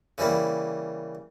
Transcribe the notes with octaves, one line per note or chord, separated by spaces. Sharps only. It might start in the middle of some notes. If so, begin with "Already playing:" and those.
C#3 E3 G3 A#3